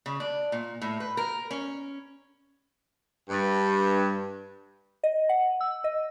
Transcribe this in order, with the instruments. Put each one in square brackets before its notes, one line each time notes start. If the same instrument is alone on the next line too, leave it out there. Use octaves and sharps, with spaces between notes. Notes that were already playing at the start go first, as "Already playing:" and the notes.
[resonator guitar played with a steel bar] C#3
D4
A#2
A2
B4
A#4
C#4
[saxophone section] G2
[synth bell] D#5
F#5
E6
D#5